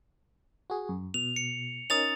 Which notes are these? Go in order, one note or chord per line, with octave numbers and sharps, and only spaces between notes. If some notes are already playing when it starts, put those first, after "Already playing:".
F#4 G#4
F#2
B2 F7
C#7
C#4 D#4 A#4 D#6 A6 F7